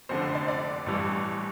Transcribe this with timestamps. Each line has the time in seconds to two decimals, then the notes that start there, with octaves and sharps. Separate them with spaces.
0.09 F1 F2 D3 C5
0.22 C5
0.35 D5
0.48 D5
0.86 A1 G2 E3